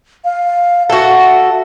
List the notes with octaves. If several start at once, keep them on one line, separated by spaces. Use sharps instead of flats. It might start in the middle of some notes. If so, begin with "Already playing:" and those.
F5
F#4 A4 E5